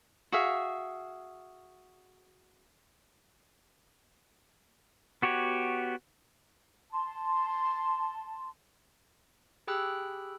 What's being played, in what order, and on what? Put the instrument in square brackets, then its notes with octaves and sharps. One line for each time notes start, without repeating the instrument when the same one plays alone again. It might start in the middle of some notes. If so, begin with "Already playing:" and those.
[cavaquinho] F#4 G#4 E5 F5
[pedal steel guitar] B3 F#4 G4 C#5
[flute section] A5 C6
[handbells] G4 G#4 G5 B5 E6 F#6